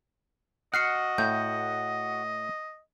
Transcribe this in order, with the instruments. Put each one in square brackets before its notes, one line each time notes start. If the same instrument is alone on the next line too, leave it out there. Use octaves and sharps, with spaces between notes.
[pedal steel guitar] F#4 F#5 [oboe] D#5 [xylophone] F6 C7 C#7
[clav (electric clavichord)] A2 [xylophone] G6